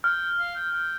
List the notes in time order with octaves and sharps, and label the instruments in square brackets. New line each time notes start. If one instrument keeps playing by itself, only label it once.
[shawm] G5 [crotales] F6
[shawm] F5
G5
G5